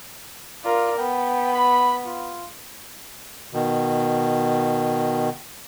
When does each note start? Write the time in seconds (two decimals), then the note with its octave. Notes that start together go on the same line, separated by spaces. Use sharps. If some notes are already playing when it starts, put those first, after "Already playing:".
0.64 F4 A#4 D5
0.98 B3 G5
1.54 B5
2.06 F4
3.53 B2 D#3